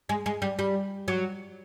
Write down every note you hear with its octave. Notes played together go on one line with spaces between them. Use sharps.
G#3
G#3
G3
G3
F#3